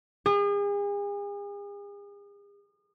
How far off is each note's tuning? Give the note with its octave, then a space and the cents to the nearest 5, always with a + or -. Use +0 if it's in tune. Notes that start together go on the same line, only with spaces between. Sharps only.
G#4 -40